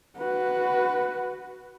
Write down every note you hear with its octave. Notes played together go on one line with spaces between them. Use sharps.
F#4 B4